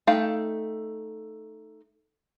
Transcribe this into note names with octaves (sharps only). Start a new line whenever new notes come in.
A3 D#4 F5 G5